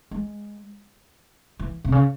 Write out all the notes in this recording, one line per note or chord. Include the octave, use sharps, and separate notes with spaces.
G#3
E3
C3
C#3